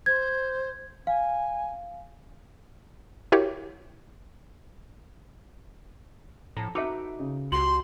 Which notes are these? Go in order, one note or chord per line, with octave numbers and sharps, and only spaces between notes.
C5 G#6
F5 G#5
E4 F#4 G4 A#4 C#5
F2 A2 A4 A#5
D#4 F#4 A4 B4 E5 D6
C#3
C#2 F#4 G4 C6 F#7